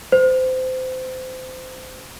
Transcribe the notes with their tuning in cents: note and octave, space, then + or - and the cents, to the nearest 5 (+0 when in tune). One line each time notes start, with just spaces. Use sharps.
C5 -25